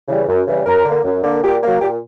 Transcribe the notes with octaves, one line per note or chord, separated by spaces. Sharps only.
C#3 E3 G3
F#2
C#3 E3 G3
F#2 A#4
D3 A#3
F#2
D3 A#3
A#2 G4
F#3 A#3
A#2 G4